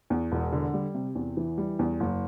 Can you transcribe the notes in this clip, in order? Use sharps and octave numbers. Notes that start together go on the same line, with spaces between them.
E2
E1
D3
G3
C3
E2
E3
G3
E2
F#1